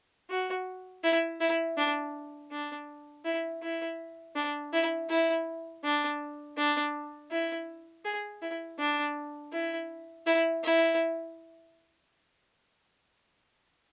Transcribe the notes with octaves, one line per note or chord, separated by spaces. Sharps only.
F#4
E4
E4
D4
D4
E4
E4
D4
E4
E4
D4
D4
E4
G#4
E4
D4
E4
E4
E4